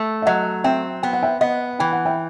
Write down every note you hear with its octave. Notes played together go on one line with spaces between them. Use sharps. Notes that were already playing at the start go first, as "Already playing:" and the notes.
Already playing: A3
E5
F#3 D#5 F#5
C4 E5 G5
B3 G5
F#5
E5 G5
B3 D#5 F#5
E3 G5
F#5
E5 G5